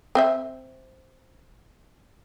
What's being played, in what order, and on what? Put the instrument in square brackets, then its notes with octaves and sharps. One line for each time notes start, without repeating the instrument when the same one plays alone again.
[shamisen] C4 C5 E5